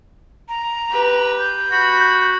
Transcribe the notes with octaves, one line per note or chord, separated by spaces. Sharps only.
A#5
G4 B4
G6
F#4 B5